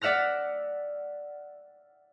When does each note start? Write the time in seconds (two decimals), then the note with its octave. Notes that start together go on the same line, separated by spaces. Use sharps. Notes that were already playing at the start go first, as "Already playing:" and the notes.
0.01 D5 E5 F#5 F6 A#6